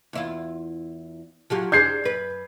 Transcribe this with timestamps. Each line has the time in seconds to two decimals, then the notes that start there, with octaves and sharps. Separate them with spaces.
0.13 E2 E4 F4
1.50 F3 F#3 G4
1.72 D4 G#4 C5 G6 G#6 C7
2.04 F#2 B4